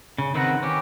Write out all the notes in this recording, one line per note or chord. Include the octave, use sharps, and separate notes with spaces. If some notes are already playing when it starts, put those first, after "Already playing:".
C#3
D#3 C4 B4 F#5 A#5
C#4 G4